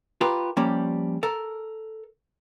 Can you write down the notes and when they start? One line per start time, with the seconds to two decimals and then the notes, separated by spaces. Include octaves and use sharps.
0.21 F4 G4 A#4 B4
0.57 F3 G3 A#3 C#4 G4
1.23 A4 A#4